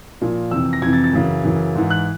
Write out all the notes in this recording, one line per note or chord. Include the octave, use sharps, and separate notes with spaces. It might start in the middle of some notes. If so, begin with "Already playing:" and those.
A#2 F3
F2 C3 E3 E6
A#6
F2 C3 E3 G#6
A6
A6
F#2 C#3 E3
F#2 C#3 E3
G#2 E3
F#6